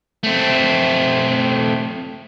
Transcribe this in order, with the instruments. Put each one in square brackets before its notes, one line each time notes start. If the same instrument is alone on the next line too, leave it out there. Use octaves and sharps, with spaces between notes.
[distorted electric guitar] A3 C4